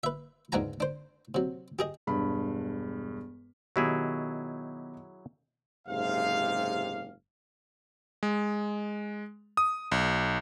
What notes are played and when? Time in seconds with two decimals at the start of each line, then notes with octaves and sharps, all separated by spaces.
0.03 B4 E5
0.52 C#2 G#2 D4 F#5 G#5 A#5
0.80 D4 C5
1.35 C3 F#3
1.79 G4 G#4 D#5
2.07 E1 G2 B5
3.76 B2 D#3 F#3 E4 G4 G#4
5.88 F#1 G#2 C3 G4 F5
8.23 G#3
9.57 D#6
9.92 B1